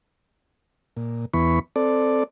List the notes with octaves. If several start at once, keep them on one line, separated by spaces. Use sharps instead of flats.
A#2
E2 E3 B3 B5 C#6
C4 A4 D5